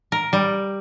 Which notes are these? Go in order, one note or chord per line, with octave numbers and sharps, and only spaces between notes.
A#4
G3